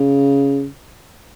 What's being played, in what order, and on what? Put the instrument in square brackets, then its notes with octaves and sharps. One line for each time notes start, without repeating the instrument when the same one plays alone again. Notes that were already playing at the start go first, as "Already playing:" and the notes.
Already playing: [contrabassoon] C#3